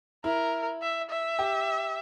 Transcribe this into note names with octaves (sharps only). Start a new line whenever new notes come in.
E4 A#4
E5
E5
G4